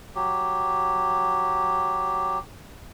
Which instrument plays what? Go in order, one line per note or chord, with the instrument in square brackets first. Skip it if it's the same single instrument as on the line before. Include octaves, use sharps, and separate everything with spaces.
[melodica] F#3 G4